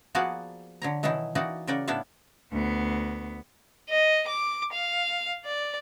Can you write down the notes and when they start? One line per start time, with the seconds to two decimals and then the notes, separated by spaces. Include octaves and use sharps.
0.15 F3 A#3 B3 F#4 G#4 D5
0.82 D3 C#5 A#5
1.03 B2 D#3 E3 F#3 D#4 E4
1.35 E3 A#3 D#4 F#4 D5 D#5
1.67 C#3 F#4 A#4 D5 G5
1.88 A2 B3 D4 E4 E5 F5
2.53 D2 B3
3.89 D#5
4.28 D6
4.73 F5
5.45 D5